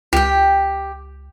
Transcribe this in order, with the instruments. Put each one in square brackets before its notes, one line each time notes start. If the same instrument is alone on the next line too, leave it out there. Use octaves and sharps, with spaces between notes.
[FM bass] C#2 [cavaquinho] G4 G5